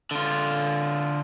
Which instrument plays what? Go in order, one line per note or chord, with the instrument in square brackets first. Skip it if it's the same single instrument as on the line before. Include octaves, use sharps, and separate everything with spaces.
[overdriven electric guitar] D3 F4